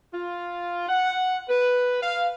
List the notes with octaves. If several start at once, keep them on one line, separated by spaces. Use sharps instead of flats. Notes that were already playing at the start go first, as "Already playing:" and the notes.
F4
F#5
B4
F5